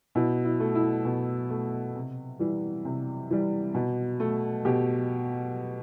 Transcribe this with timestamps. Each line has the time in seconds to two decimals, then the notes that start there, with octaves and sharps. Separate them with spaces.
0.15 B2 E4
0.45 E4
0.60 A3
0.75 E4
1.05 B2
1.50 A3
1.95 C3
2.39 E3 G3
2.85 C3
3.30 E3 G3
3.74 B2
4.20 A3
4.65 B2 G4